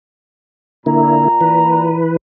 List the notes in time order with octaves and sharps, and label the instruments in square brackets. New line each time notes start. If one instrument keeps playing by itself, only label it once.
[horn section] A#2 A#5 [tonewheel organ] D3 A#3 E4
[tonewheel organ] E3 B4